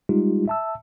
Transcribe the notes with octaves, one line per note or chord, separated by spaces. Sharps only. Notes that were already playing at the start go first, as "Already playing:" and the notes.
G3 G#3 D#4 F4 G4
E5 A5 E6